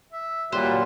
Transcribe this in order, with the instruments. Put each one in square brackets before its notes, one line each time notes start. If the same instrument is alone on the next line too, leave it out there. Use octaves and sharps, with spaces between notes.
[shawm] E5
[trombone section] A#2 G3 [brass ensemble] F#3 [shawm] B4 [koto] C5